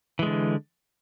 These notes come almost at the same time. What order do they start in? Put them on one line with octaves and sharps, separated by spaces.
E3 G#3 D3